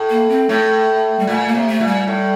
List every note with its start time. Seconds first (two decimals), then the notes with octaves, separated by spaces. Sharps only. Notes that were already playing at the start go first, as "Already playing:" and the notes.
Already playing: A2
0.09 A#3
0.29 C4
0.49 A2 A3
1.19 G3
1.27 A#2 A3
1.48 A#3
1.55 C3
1.68 A3
1.80 A#2
1.87 G3
2.07 A2